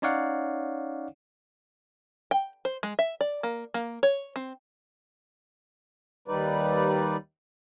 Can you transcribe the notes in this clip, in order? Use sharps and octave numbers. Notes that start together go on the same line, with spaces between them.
C#4 D#4 C#5 D5 F5 F#5
G5
C5
G#3
E5
D5
A#3
A#3
C#5
C4
D#2 G3 D#4 B4 D5